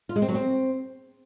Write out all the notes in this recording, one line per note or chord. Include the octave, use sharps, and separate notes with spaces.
F4
G#3
C4
F#3
C4